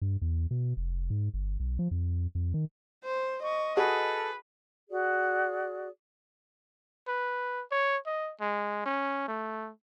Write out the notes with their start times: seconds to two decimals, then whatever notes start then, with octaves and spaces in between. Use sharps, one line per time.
0.02 G2
0.22 E2
0.51 B2
0.77 F1
1.10 G#2
1.34 G1
1.60 B1
1.79 F3
1.91 F2
2.35 F2
2.54 D#3
3.05 C5
3.43 D#5 C#6
3.77 F#4 G#4 A4 B4
4.89 F#4 G#4 D5
7.08 B4
7.71 C#5
8.06 D#5
8.40 G#3
8.86 C#4
9.28 A3